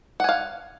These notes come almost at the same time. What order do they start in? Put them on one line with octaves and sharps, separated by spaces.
F#5 G#5 F5